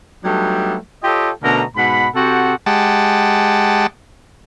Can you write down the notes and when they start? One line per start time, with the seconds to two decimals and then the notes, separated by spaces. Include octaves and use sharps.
0.24 F#3 G3 A3 B3 D4 D#4
1.04 F4 G4 A4 C#5 D#5 G5
1.43 B2 D3 A3 C#4 A#4 A#5
1.76 G#2 B2 F#5 B5
2.15 C3 C4 F#4 G4 A4 F#5
2.66 G#3 G4 F#5 A5